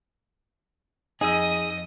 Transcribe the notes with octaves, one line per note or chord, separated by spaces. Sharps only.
F2 D#4 G#4 D#5 D#6 E6